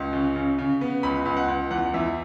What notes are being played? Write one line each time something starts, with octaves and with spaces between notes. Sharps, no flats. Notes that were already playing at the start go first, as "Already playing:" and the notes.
Already playing: C#2
C#3
C#3
C#3
B3
C#2 B5
C#2
F#5
C#2
E2 F#5
E2 E5